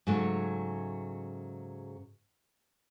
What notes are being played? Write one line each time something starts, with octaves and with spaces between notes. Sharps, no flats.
G#2 C#3 F#3 A3